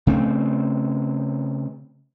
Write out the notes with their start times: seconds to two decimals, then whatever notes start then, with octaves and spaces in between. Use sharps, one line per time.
0.07 C#3 A3 C4